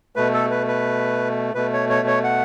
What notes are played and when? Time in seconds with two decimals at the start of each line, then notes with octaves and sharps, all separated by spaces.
0.16 B2 A3 B4
0.34 A4
0.51 B4
0.68 B4
1.55 B2 A3 B4
1.73 C#5
1.90 C#5
2.07 C#5
2.24 F#5